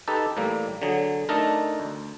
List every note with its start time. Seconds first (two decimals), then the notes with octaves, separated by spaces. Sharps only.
0.08 D#4 G4 A4 B4
0.37 A2 E3 G3 A#3
0.82 D3 F#3 G#4
1.29 A3 D4 D#4 A4 A#4
1.80 D2